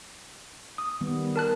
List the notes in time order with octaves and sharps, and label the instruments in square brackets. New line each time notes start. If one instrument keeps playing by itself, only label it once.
[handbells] D#6
[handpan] D#3 G3 B3
[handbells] A#4 A5 F#6